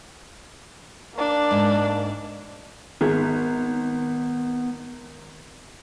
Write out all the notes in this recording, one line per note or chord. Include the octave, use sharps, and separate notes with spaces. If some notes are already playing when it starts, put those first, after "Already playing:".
A#3 D4
G#2
G#1 B3 G#4 E5